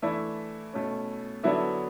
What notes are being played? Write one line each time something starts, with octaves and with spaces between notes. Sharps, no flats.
E3 A3 D4 E4 E5
B2 A3 C#4
D3 F#3 B3 D4 E4 E5